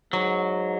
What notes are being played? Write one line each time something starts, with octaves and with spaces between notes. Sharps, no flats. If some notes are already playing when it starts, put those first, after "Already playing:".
G#2 F#3